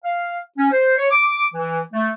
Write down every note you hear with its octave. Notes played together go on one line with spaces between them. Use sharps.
F5
C#4
C5
C#5
D6
E3
A3